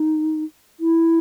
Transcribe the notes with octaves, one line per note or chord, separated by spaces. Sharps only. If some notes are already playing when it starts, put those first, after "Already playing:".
Already playing: D#4
E4